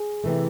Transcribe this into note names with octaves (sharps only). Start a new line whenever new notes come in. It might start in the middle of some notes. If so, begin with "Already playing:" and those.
Already playing: G#4
C3 E3 A3